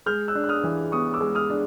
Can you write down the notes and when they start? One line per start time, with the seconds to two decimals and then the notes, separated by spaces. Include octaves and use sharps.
0.06 G#3 F6 G6
0.28 E6 F#6
0.35 D4
0.44 F#6
0.49 D#6 F6
0.63 E3
0.92 B3 C#6 D#6
1.14 D6 E6
1.20 G#3
1.35 D#6 F6
1.50 D4